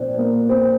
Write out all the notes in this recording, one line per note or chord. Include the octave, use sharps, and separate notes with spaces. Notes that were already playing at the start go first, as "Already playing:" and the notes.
Already playing: A#2 F3 C4 D4
A#3
C4